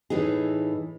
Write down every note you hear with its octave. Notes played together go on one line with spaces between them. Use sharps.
A2 E3 D#4 G#4